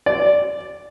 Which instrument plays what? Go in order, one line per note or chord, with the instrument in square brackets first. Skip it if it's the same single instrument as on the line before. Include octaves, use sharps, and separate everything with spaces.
[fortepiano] D5